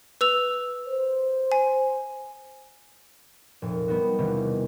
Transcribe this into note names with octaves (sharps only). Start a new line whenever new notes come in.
B4 E6 F7
C5
G#5
F1 A#2
G3 B3 D#4 F#4
E1 C3 D#3 E3